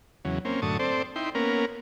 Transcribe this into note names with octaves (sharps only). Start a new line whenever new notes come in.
E2 C#3 F#3
A#3 C4 C#4
F#2 A2 D3 A5 C#6 D#6
C4 A4 C5 D5
D#4 E4 G5 C6
A#3 B3 C#4 A#4